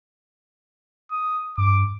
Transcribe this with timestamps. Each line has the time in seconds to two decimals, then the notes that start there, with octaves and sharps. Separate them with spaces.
1.12 D#6
1.58 G2 D6